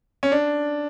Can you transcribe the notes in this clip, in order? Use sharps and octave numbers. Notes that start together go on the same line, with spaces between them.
C#4
D4